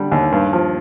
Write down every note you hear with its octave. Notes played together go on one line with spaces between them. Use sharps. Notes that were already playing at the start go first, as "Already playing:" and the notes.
Already playing: D3 G3
D#2
G2
F3